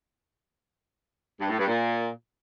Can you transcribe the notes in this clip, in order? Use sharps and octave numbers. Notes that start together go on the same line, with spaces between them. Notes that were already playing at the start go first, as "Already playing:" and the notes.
G2
A2
G2
A#2